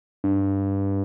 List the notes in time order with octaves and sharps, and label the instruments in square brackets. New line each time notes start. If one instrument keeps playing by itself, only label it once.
[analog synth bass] G2